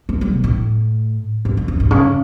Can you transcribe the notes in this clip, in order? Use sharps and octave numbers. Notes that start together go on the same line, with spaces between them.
A3
G3
B2
A2
G2
F#2
F#2
G2
C#3